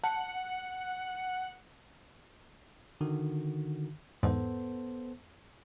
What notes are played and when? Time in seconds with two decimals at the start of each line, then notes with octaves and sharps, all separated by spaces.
0.04 F#5 A5
3.01 D3 D#3 F#4
4.23 E2 G#2 B3 A4 C5